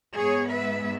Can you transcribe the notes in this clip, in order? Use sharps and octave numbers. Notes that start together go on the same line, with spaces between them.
G#2 G#3 B3 G#4 C#5
B4 E5